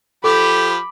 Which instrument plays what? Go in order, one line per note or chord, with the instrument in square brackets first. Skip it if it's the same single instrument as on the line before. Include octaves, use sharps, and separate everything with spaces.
[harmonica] F3 G4 [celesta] A4 [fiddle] B5 [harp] D6